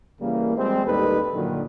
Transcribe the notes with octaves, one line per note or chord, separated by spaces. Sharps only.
C#3 E3 G3 A#3
F3 G3 G#3 C4
A1 D#2 G3 D#4 A4 B4
G2 A#2 D3 D#3 F#3